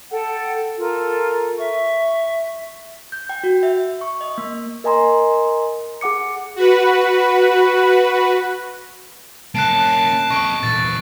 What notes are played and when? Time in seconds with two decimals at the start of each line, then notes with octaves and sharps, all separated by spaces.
0.11 A4 F#5 G5
0.79 F4 A4 A#4
1.58 E5 C#6
3.12 G6
3.29 G5
3.44 F#4
3.63 E5
4.01 C#6
4.21 D#5
4.38 A#3
4.84 A#4 D#5 G#5 A#5 C6
6.01 G#4 F#5 D6 C#7
6.56 F#4 B4
9.55 A#3 C#4 A5 F#6 C7 D7
10.31 A4 D#5 C#6 D7
10.63 E2 A#2 A6